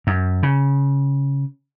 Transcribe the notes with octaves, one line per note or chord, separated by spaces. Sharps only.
F#2
C#3